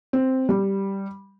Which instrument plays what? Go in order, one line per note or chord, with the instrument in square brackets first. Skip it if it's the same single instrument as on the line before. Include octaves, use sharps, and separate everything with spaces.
[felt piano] C4
G3